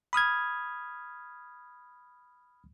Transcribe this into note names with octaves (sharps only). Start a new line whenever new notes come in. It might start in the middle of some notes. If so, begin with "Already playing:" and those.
B5 D#6 F6 G#6